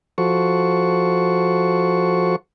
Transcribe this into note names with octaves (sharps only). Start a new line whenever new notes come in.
F3 F#4 A4 C5 C#6